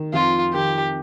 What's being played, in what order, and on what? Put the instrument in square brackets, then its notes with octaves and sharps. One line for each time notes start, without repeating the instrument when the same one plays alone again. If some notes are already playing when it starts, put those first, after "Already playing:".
Already playing: [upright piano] D#3
[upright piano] F2 F3 [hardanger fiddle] F4
[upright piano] D#3 [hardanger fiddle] G4